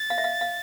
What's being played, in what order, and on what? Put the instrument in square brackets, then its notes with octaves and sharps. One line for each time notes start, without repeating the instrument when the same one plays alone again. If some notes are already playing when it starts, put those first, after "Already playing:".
Already playing: [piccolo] A6
[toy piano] F5
E5
F5
F5